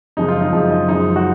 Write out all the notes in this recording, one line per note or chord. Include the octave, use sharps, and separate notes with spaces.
F#2 C#3 F3 G#3 D#4
F4
D#4
F#2 C#3 F3 G#3
D#4
F#2 F3 G#3 D#4
F#4